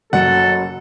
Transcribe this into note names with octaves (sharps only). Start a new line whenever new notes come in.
F#1 F#2 F#3 A4 F#5 C#7